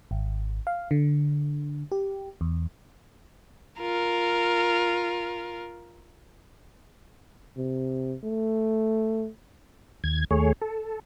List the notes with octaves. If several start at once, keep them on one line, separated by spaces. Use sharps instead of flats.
G#1
F5
D3
G4
E2
F4 A#4
C3
A3
D#2 G#6
D#2 A3 G#4 C#5
A4